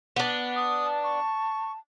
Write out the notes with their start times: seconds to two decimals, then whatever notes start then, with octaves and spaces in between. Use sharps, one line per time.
0.16 B3 D4
0.56 D#6
0.84 A5
1.04 C#6